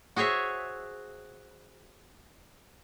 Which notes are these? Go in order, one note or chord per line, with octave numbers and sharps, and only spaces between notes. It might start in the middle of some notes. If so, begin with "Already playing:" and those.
F#4 G#4 C5 C#5 E5